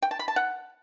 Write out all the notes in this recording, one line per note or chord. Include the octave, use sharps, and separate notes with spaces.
G5
A5
B5
A5
F#5